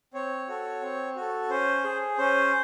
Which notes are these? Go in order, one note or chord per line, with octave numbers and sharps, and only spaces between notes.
C4 C#5
F#4 A4
C4
F#4 A4
C#4 C5
G#4
C#4 C5